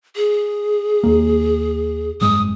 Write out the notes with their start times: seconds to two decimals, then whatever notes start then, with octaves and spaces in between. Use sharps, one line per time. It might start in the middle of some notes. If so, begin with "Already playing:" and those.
0.16 G#4
1.03 D#2 A#3
2.21 F#1 G#2 G#3 D#6